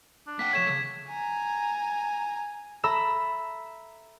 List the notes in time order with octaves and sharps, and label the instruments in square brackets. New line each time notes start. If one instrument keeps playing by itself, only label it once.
[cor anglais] D4
[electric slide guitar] A#3 F#5 G5 [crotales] B6
[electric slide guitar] F3 A3 [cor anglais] C#5 [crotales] G#6 E7
[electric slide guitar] C#3
[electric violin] G#5 A#5
[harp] A4 E5 A#5 B5 E6